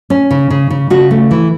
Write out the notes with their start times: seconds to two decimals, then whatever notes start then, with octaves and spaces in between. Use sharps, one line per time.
0.10 C#4
0.31 C#3
0.50 C#3
0.71 C#3
0.90 C#3 F#4
1.11 A3
1.31 E3